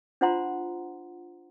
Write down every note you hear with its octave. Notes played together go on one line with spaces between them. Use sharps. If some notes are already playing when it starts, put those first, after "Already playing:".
D4 F4 C5 F#5 A#5 C6